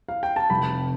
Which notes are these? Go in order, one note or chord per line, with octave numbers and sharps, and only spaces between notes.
F5
G5
A5
F1 B5